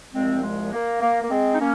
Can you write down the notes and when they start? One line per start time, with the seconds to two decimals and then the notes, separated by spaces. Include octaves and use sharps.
0.13 C2 A#2 F3 G#3 C4
0.42 G#3
0.72 A#3
1.02 A#3
1.22 A#3
1.30 G#3 C4
1.53 D#4
1.59 A#3 C#4